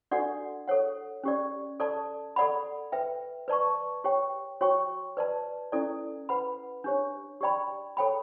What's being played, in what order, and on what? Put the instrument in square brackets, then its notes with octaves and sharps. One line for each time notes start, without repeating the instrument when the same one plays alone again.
[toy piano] D4 F#4 A4 D5 F#5
A4 C#5 F#5
C#4 G4 D5
A4 D5 A5
A4 D5 F#5 B5
B4 E5 G5
B4 D5 A5 C#6
G4 C#5 G5
F#4 C#5 G5 C#6
B4 D5 A5
C#4 E4 A4 D5
B4 F#5 B5
D4 G4 C#5
G4 D5 G5 B5
A4 C#5 G5 B5